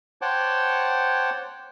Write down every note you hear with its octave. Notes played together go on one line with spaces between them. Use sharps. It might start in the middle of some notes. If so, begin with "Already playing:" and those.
C5 C#5 F#5 G5 A5 D6